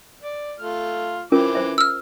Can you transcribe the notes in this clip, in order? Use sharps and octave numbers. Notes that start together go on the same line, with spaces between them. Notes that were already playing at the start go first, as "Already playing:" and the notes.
D5
A3 F4 F6
E3 C4 C#4 F4 A#4 D6
C5 E5
E6 F6